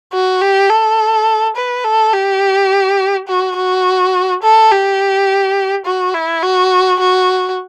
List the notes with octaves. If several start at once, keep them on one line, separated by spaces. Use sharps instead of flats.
F#4
G4
A4
B4
A4
G4
F#4
F#4
A4
G4
F#4
E4
F#4
F#4